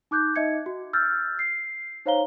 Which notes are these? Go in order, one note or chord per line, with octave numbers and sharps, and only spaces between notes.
D#4 D6 F#6 G6
D#4 D#5 E5 G#6 C#7
F#4
E6 F6 G6 A6
C7
D#4 C5 C#5 F5 A#5 G7